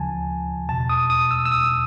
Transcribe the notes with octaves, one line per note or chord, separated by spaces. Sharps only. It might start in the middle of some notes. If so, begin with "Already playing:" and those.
Already playing: D2 C#3 F3 G#5 A5
E2 B2 A5
D#6
D#6
E6
E6
D#6